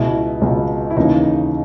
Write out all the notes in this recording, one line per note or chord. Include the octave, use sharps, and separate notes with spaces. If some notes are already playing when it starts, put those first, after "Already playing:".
Already playing: C#2 B2 E4
C#2 B2
E4
D#2 C#3 E3 D#4